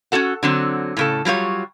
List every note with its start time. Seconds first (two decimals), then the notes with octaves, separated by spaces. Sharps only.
0.12 C#4 D4 F#4 A4 F#5
0.43 D3 F#3 C4
0.97 A2 C#3 A4
1.25 F#3 G3 F4 C#5